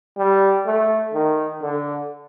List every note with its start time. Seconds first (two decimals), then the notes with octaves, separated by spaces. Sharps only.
0.18 G3
0.66 A3
1.14 D#3
1.62 D3